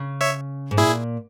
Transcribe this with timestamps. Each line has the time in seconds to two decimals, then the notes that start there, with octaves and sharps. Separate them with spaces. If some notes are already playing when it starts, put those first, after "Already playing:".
Already playing: C#3
0.21 C#5 E5
0.71 G#2
0.77 A#2 E4 G#4